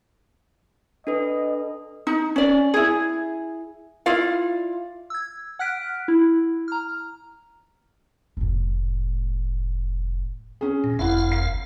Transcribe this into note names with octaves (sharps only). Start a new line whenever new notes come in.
D4 A4 B4 D#5
D#4
C#4 D5
E4 G#4
E4 F4 D5 F5
E6 G#6
F#5 F6 F#6 B6 D7
E4
A#5 F6
F1 A2
C#4 G#4
A#2
F#1 F2 E4 F5 F#5
C7